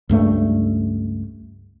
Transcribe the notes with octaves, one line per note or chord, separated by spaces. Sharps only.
C#2 G2 A3